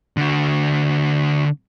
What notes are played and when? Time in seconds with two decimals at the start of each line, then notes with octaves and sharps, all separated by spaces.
0.17 D3 F#4